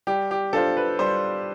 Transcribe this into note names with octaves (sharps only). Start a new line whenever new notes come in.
G3 G4
G4
D4 F4 A4 C5
B4
G3 C5